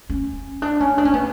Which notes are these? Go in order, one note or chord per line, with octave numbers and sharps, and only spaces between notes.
C#4
D4
C#4
D4
C#4
B3